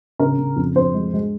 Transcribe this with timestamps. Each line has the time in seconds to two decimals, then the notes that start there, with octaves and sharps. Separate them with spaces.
0.19 C#3 A#4
0.38 C#3
0.56 F2
0.75 F2 C5
0.94 G#3
1.14 G#3